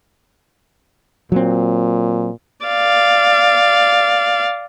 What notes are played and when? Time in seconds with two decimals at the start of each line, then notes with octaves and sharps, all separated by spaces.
1.32 A#2 F#3 C4
2.66 D5 F5